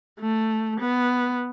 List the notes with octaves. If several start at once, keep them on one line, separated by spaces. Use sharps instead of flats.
A3
B3